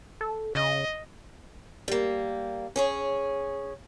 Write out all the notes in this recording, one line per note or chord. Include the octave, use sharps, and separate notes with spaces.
A4
C#3 D#5
G3 A#3
C#4 G#4 C#5